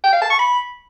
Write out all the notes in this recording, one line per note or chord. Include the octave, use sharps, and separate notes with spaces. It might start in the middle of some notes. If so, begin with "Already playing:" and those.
G5
F5
A5
C#6
B5